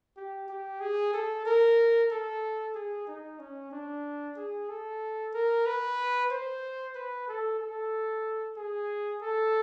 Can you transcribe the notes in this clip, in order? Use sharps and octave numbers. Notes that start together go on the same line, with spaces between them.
G4
G4
G#4
A4
A#4
A4
G#4
D#4
C#4
D4
G#4
A4
A#4
B4
C5
B4
A4
A4
G#4
A4